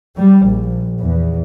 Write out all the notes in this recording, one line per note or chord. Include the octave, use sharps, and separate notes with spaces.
G3
A#1
E2